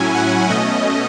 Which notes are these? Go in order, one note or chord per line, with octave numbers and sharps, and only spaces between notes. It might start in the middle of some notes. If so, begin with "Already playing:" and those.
Already playing: A2 F#3 C#4 E4 G#5
F#5
B2 A3 C#4 D#5